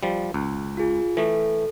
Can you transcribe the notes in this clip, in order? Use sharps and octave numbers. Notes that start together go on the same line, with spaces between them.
F3 G3
C#2
F4 G#4
E3 A3 A4